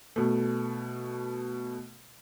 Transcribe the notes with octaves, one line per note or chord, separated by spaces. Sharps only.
B2 A3